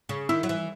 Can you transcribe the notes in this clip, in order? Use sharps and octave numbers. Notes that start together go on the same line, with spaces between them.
C#3
D#3 E4
F#3
E3